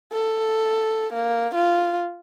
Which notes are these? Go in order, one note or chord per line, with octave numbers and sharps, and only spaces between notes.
A4
A#3
F4